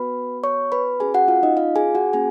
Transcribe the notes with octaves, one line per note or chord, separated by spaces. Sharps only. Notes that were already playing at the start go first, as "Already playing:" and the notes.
Already playing: B3 F#4 B4 B5
C#5 C#6
B4 B5
C#4 F#4 G#4 G#5
F#4 F#5
F4 F5
D#4 D#5
F4 F5
G#4 G#5
F#4 F#5
A#3 C#4 G#4 G#5